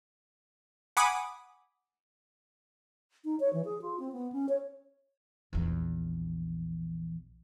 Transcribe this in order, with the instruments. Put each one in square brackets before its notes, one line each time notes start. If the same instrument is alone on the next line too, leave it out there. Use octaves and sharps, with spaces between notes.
[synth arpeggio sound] F#5 G#5 B5 D6 D#6
[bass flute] D#4
C#5
E3
G#4
F4
C4
B3
C#4
C#5
[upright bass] A#1 E2